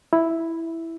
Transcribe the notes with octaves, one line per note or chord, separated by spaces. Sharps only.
E4